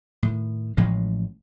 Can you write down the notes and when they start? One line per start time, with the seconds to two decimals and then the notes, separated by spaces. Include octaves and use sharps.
0.23 A2 D#3
0.77 A1 A2 F3 G#3